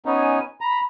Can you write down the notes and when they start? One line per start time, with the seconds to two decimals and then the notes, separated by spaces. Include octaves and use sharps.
0.05 B3 C#4 D#4 G#5
0.61 A#5 B5